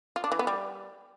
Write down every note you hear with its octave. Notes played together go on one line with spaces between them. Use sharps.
F4
D4
E3
B3
G3